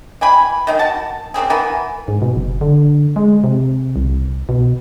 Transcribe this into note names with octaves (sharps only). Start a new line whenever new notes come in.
E3 G5 G#5 B5
D#3 D#4 A#4
F#4 A5
C#3 A#3 C4 G#4
E3 B3 A#4 G#5
G#2
B2
F#1
D3
G#3
C3
C2
B2